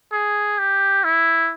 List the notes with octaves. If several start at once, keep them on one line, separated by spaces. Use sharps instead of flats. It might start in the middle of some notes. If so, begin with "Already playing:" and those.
G#4
G4
E4